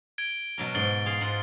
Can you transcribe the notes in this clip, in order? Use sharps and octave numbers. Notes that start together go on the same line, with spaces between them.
G#6 D7 G7
B2 F#3 A#4
G#2 A6 G7
G#4 F5 C6
G#2 F4 F#5